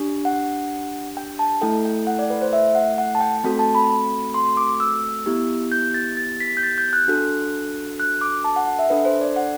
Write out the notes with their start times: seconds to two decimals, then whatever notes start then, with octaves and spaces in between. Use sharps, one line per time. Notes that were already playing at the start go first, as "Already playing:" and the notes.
Already playing: D4 G4
0.25 F#5
1.17 G5
1.39 A5
1.61 A3 E4 A4 G5
1.85 G5
2.07 F#5
2.19 D5
2.30 B4
2.42 C5
2.53 E5
2.75 F#5
2.98 F#5
3.15 A5
3.21 G5
3.44 A3 C4 F#4 A4 G5
3.59 A5
3.75 B5
4.34 C6
4.57 D6
4.80 E6
5.26 B3 E4 G4
5.72 G6
5.94 A6
6.17 A6
6.40 B6
6.57 G6
6.63 A6
6.78 G6
6.93 F#6
7.08 D4 F#4 A4
8.00 F#6
8.21 D6
8.44 A5
8.56 F#5
8.67 F#5
8.79 E5
8.90 D4 A4 B4
9.05 C5
9.21 D5
9.36 F#5